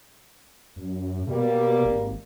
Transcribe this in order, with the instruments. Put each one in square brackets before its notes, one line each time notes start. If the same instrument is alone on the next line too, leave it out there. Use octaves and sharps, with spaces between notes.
[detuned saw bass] F#2
[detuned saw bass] B2 [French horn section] G3 A#3
[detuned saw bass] G#1